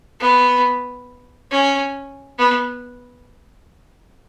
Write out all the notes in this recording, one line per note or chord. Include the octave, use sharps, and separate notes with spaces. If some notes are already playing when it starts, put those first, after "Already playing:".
B3
C#4
B3